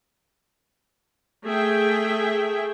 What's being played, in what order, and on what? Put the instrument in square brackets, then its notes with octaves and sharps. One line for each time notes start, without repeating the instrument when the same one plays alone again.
[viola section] A3 G#4 E5 G5